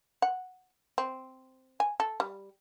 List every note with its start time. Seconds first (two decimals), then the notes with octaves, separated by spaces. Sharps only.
0.22 F#5
0.98 C4
1.80 G#5
2.00 A4
2.20 G3